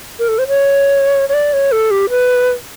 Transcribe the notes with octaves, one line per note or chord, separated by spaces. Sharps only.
A#4
A4
C5
C#5
C#5
D5
C#5
A4
G4
B4